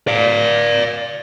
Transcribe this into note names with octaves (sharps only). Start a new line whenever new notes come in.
D5 F5